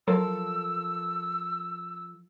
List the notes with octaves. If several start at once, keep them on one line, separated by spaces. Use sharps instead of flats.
F3 F#3 A4 A#4 E6